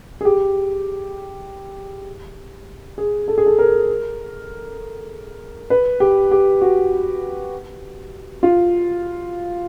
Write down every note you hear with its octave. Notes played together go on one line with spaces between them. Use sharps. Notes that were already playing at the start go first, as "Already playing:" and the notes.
G#4
G4
G#4
A4
G#4
A4
A#4
B4
G4
G4
F#4
F4